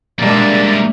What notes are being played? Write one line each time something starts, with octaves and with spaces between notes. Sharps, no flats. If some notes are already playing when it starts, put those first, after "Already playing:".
G3 G#3 A#3 D4 E5 A6